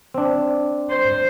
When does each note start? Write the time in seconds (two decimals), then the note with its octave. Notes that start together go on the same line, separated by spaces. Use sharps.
0.14 C4 D4
0.90 C5